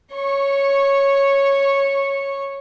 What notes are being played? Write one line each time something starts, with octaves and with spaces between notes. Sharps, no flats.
C#5 C#6